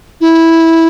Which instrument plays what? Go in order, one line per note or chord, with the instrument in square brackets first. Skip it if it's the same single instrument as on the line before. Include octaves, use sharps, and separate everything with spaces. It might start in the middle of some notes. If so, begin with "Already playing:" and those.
[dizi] E4